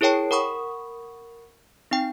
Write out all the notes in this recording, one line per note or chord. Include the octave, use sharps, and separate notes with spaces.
E4 G#4 A#4 C#5 G5 A5
A#4 F#5 B5 C#6 D#6
C4 D#4 G5